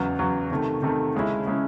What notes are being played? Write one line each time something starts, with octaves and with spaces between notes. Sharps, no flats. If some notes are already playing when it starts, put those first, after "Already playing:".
Already playing: E2 C#3 F#3
E2 C#3 F#3
C3 D#3 A3
C3 D#3 A3
C#3 G#3 C#4 E4
C#3 G#3 C#4 E4